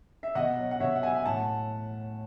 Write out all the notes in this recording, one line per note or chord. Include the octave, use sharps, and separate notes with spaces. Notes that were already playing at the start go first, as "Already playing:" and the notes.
E5
B2 D#5 F#5
F#3
F#5
B2 C#5 E5
F#5
F#3 E5 G#5
G#5
A2 F#5 A5